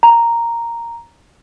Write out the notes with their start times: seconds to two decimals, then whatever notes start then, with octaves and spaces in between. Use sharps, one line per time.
0.03 A#5